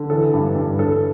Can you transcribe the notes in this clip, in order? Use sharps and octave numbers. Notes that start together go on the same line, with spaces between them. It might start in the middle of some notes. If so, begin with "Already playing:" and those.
Already playing: D3
E3 A4
G2
G2
G2 A4